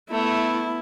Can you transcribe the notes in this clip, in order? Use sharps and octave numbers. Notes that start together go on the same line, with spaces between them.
A3 B3 E4